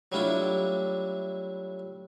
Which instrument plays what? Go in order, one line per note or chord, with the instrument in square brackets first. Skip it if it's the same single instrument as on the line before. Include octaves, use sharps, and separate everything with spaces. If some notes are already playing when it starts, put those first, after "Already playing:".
[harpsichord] F#3 G3 A3 D4 E4 F4